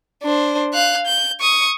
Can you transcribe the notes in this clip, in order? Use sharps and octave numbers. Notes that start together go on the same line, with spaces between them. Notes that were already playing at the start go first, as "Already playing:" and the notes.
D4 C5
F5 F#6
G6
C#6 D#6